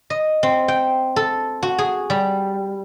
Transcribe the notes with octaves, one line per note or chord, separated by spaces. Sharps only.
D#5
C4
G5
A4
F#4
G#4
G3